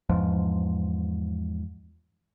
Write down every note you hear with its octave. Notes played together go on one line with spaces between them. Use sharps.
E2 G#2 F3